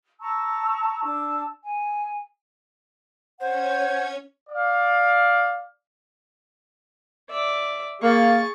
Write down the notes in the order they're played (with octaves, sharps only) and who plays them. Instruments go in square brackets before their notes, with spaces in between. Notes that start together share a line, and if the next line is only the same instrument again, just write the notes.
[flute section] A5 A#5 C#6 E6
D4 A5 E6
G#5
[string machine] C#4 C#5 G#6 [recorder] C5 [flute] F#5
[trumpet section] D5 F5
[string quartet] D5 E5
[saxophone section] A#3 [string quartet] G#4 C#6 A6